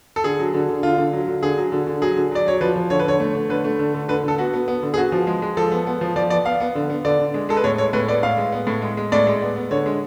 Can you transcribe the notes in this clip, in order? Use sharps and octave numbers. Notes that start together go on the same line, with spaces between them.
A4
D3 G#4
F#3
D3
D3
D3 F4
D3
F#3
D3
D3 G#4
F#3
D3
D3
F#3 G#4
D3
F#3 D5
F#3 C#5
F3 B4
F3
D3 C#5
B4
D3 C#5
A3
A3
D3 B4
A3
D3
D3
D3 B4
D3 A4
B3 F#4
B3
B3
D3
G#4
B3 F#4
F3
G#3
G#3
F3 A4
B3
B3
F3
F3 D5
B3 D5
B3 F5
B3
D3
B3
D3 D5
D3
G#3
G#3 A4
B4
A2 C#5
G#3 C#5
A2 B4
B3 D5
A2 F5
G#3
B3
A2
G#3
G#3
A2 D5
G#3
B3
B3
D3 C#5
G#3